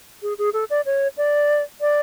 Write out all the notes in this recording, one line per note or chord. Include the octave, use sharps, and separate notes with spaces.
G#4
G#4
A4
D5
C#5
D5
D5